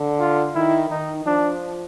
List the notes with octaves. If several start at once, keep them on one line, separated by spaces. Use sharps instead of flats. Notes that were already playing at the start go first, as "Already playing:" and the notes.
Already playing: D3
F4
D#3 E4
D#3 D#4
F3 D4